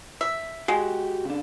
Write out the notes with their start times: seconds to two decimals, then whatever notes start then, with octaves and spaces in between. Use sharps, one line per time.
0.21 E5
0.68 G#3 F#4 G4 F#5
1.25 C#3 D4